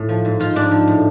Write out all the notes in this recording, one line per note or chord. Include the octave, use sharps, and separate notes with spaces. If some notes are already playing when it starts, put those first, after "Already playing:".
Already playing: A2
F3
G#2
F3 F4
G#2 D4
F3
A2